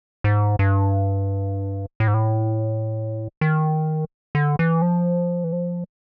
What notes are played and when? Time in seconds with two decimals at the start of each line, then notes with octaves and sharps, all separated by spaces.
0.24 G#2
0.59 G2
2.00 A2
2.08 G#2
2.14 A2
3.41 D#3
4.35 D3
4.59 E3
4.82 F3
5.44 E3
5.52 F3